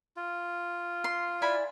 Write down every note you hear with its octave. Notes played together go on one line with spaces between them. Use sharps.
F4
C6
E4 D5 G#5 B5